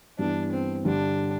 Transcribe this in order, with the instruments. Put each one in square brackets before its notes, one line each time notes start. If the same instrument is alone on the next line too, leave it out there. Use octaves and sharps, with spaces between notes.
[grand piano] G2 E3 B3 [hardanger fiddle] D4
[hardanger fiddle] C4
[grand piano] G2 D3 G3 [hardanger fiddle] D4